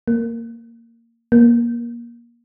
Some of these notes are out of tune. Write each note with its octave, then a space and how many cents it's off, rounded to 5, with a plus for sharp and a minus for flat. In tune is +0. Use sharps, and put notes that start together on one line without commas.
A#3 -15
A#3 +20